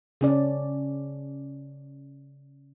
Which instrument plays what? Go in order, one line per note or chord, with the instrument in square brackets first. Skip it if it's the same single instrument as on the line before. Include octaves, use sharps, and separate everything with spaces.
[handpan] C#3 C#4 D5